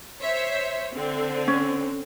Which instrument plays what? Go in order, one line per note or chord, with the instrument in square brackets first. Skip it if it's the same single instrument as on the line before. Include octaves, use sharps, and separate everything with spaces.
[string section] C5 C#5 E5
D3 C4
[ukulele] C#4